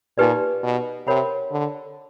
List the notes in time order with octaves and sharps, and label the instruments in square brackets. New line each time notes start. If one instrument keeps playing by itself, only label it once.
[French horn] A#2 [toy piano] D#4 G4 B4 D5
[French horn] B2
[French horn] C3 [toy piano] A#4 C#5 F#5 B5
[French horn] D3